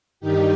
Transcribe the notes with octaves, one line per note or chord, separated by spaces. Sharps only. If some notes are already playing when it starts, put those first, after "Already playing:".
G2 D#3 G3 D#4 G4